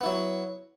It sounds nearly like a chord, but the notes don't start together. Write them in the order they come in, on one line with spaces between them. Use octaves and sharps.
B3 E4 F#3